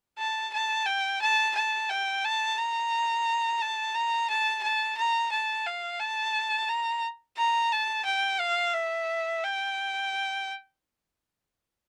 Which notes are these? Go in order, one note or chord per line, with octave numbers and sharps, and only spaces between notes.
A5
A5
G5
A5
A5
G5
A5
A#5
A5
A#5
A5
A5
A#5
A5
F5
A5
A#5
A#5
A5
G5
F5
E5
G5